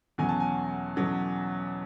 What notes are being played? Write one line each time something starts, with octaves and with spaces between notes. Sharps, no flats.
E2 B2 F#3 C#4 G#5
A5
G#5
E2 B2 F#3 C#4